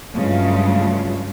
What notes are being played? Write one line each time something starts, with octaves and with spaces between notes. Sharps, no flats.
G2 C#3 F#3 G#3 A3 F4